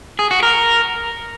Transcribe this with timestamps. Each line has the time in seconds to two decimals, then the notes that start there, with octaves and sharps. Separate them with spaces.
0.19 G#4
0.31 F#4
0.43 A#4